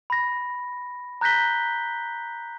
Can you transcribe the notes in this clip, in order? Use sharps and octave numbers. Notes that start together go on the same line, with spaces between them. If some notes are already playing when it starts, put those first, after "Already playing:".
B5 A#6
A#5 F#6 G6 A#6 B6 G7